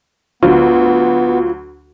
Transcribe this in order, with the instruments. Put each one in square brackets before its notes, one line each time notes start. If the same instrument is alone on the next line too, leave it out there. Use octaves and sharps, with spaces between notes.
[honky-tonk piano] D2 D3 F#3 [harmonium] B3 [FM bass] F4